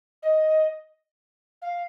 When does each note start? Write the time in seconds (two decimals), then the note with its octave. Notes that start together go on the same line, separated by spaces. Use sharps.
0.23 D#5
1.62 F5